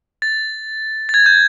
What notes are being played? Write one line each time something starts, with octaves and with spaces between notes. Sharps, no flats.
A6
A6
G#6
G6